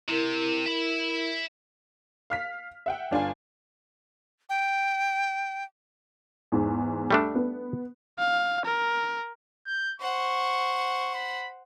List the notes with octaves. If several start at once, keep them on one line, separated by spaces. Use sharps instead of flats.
C3 E4 A#4
E5 B5
F5 F6 B6
E5 F#5 G5
G1 D4 F4 G#5
G5
E2 G#2
G3 A3 D4
B3
F5
A#4
G6
C5 F#5 C#6
B5